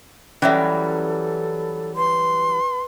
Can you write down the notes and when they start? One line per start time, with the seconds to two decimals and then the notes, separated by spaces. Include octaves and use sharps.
0.42 E3 F#3 G3 C#4 A4 E5
1.96 B4 C6